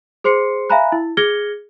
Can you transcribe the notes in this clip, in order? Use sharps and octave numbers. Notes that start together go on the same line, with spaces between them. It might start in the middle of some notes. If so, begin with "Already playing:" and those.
G#4 C5 C6 C7 C#7
E5 F5 G#5 A#5 B5 F#6
E4
G#4 F6 G#6 A#6 C#7 G7